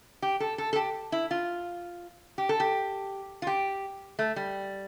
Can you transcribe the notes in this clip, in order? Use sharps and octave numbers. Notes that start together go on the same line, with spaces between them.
G4
A4
A4
A4
G4
E4
F4
G4
A4
G4
F4
G4
A3
G3